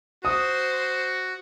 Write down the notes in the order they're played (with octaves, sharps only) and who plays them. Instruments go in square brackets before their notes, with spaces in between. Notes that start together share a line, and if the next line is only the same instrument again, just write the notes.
[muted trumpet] F#4 [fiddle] C5 [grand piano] D#6